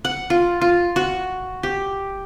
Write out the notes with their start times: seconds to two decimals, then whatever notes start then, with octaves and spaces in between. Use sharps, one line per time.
0.05 F#5
0.30 F4
0.61 F4
0.96 F#4
1.63 G4